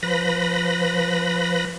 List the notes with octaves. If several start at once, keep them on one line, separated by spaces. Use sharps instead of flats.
F3 B4 B5 A#6